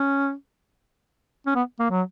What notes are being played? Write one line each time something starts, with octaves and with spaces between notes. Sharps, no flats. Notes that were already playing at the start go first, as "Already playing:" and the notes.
Already playing: C#4
C#4
B3
A#3
F#3